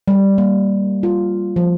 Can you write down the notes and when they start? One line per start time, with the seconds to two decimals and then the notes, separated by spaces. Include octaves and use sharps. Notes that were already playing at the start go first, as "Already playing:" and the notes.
0.08 G3
0.38 A#3
1.03 F4
1.56 F3